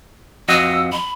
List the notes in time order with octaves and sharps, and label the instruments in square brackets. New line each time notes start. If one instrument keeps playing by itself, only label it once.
[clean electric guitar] F2 F#4 D#5 [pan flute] E6
[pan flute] B5